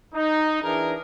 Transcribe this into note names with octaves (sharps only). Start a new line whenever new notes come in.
D#4
E3 D4 G#4 A#4